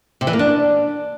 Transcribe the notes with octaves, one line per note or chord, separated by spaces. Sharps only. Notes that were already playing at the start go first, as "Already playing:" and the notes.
C3
E3
A#3
D4